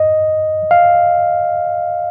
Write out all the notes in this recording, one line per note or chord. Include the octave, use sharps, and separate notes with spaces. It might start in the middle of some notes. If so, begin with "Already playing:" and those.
Already playing: D#5
F5